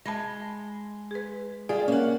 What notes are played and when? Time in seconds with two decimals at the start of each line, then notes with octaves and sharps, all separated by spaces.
0.06 G#3 A5 B5 A#6
1.11 G#4 B4
1.69 G3 F4 G#4 D5
1.88 A#3 C#4 F#5